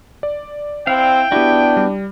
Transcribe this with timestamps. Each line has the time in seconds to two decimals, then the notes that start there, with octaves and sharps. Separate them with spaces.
0.23 D5
0.87 C4 E4 F5 G5
1.32 B3 D4 E4 F#4 G4
1.77 G3